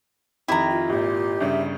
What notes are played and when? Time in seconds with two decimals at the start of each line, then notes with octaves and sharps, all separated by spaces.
0.48 F2 D#3 E4 G4 A#5
0.70 F4
0.90 G#1 A#2 G4
1.40 G1 G2 C#3 E5